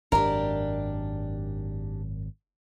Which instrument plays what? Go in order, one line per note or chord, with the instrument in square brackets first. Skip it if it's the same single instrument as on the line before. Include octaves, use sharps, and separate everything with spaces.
[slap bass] G#1 F#2 [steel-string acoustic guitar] D4 G4 [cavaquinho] A#4